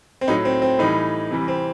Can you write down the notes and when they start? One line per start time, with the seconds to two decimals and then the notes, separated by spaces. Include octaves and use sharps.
0.21 C4
0.28 A2 F#3 D#4
0.45 C4
0.62 C4
0.79 A2 E3 G3 D#4
1.31 C3 E3 G3
1.48 C4